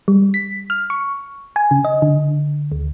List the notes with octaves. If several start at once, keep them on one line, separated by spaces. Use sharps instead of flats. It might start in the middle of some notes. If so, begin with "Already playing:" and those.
G3
B6
F6
C#6
G#5
C#3
D#5
D3
D2